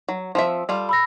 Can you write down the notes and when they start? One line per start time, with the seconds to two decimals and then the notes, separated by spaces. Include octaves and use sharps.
0.09 F#3
0.35 F3 C4 E5
0.69 G3 F4 A4
0.89 B5 E6 A#6